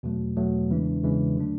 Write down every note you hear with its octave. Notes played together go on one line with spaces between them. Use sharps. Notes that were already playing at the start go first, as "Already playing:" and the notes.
E2 B2 F#3 A3
E2 B2 F#3 A3
E2 C#3 E3 G#3 D4
E2 C#3 E3 G#3 D4
D3 F#3 A3 D4